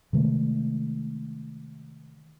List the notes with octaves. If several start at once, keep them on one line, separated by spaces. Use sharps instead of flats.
C3 D#3 G#3 A3